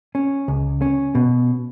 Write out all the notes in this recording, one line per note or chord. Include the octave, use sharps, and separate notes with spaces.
C#4
C#2
C#4
B2